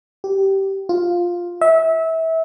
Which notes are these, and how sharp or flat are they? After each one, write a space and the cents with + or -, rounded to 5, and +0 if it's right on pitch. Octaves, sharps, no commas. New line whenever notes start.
G4 -15
F4 +5
E5 -25